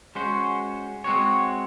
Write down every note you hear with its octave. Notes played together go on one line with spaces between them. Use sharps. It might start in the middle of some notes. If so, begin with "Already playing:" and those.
G#3 C#4 F#4 C5
G#3 C4 F#4 C#5